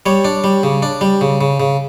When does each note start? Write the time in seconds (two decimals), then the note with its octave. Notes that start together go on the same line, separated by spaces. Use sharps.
0.06 G3 C#5
0.25 D4
0.44 G3
0.63 C#3
0.83 D4
1.01 G3
1.21 C#3
1.41 C#3
1.60 C#3